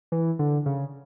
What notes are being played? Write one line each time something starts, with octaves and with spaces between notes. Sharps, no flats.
E3
D3
C#3